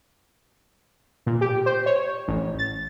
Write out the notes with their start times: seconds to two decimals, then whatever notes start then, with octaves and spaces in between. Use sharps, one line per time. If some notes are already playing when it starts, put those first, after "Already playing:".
1.26 A#2
1.41 G4
1.66 C5
1.86 C#5
2.28 A1
2.59 A6